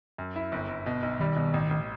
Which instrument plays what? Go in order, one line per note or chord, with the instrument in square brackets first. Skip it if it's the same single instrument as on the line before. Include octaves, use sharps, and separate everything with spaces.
[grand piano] F#2
E4
G1
G1
B2
B1
[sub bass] D#3 [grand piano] G3
[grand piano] B2
A1
A1